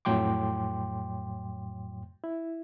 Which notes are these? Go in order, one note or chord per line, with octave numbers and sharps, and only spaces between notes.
F2 A2 F#3 G5 C6 D6
E4